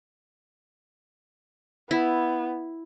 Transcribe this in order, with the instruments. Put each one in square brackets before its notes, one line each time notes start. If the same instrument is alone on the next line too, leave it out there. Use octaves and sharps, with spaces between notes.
[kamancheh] B3 [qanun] E4